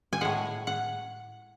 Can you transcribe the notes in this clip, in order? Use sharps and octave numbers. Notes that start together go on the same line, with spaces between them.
G#5
A2 G#3 F#5
F#5